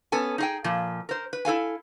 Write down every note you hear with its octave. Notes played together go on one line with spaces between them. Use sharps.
B3 C#4 A4 G#5
D#4 G#4 G5
A#2 F3
A#4 C5
B4
E4 A4 F5 G#5